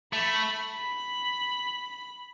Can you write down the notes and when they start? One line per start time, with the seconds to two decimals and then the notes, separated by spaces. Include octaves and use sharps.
0.13 A3 B5
0.76 B5